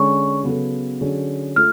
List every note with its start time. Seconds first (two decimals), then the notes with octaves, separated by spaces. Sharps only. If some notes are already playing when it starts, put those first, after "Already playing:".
Already playing: D3 G#3 C#4 C#6
0.43 C#3 F#3 B3 F#4 A4
1.01 D3 F#3 C#4 G#4
1.56 A3 F4 F6